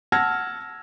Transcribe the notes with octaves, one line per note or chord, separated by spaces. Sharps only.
F#5 A5 E6 F6 G#6 A#6